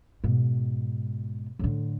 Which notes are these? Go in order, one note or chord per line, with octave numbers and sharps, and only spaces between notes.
G#2 B2
A2 D3